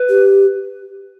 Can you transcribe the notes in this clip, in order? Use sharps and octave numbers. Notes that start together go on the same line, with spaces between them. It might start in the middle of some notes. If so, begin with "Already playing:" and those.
Already playing: B4
G4